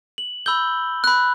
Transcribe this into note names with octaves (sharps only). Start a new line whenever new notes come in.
F#7
B5 E6 G6 G7
B5 F#6